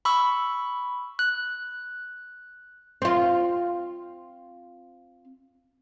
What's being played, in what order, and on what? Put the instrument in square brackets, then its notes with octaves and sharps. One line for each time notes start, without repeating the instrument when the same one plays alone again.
[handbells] B5 C#6 E6
F#6
[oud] C4 F4